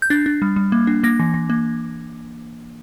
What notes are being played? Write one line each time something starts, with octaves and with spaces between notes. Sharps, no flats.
G6
D4 A6
D4
G3
G3
A#3
D4
A#3 A#6
E3
E3
A#3